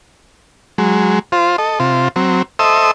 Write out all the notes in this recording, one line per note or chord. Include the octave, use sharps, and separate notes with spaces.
F#3 G#3
F4 C5
A4 D#5
C3 F4 C5
F#3 C4
A4 C5 D#5 E5 D#6 E6